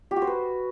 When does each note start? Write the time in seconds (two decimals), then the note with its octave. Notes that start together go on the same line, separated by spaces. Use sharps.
0.11 G4
0.16 F#4
0.22 C5
0.27 B4